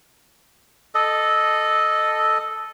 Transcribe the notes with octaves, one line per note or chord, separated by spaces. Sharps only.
A4 D#5